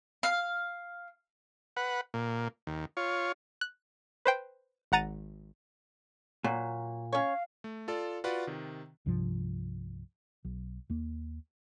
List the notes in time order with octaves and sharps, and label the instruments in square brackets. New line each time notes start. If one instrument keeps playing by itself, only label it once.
[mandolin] F5
[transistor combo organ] B4 F#5
A#2
D#2
F4 C#5
[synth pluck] F#6
B4 C5 G5
G#1 F#5 A#5 A6 D#7
[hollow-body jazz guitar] A#2 [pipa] F#3
[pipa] C#4 C#5 [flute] F5
[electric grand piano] A3
F4 A4 D5 F5
F4 F#4 B4 D5 F#5
C3 D#3
[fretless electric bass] C2 G2 C3 F3
B1
D#2 A#3